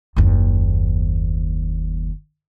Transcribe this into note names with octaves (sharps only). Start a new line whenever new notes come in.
F#1 D#2